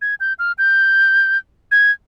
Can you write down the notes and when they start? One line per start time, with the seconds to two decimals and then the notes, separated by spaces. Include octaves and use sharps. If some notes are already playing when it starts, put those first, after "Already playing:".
0.01 G#6
0.20 G6
0.39 F6
0.58 G6
1.71 G#6